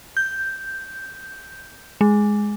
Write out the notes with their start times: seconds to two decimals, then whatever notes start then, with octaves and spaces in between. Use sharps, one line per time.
0.17 G6
2.01 G#3